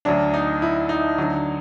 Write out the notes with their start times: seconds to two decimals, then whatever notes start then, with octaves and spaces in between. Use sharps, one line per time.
0.05 D2 D3 F#3 D4
0.34 D#4
0.62 E4
0.89 D#4
1.18 D2 D3 F#3